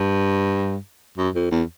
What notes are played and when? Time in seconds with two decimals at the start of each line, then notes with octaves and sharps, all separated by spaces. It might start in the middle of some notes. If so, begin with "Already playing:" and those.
Already playing: G2
1.18 F#2
1.35 F2
1.51 E2